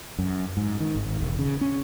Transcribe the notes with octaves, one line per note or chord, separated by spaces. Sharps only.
F#2
G#2
D#3
G#1
E1
C#3
C#4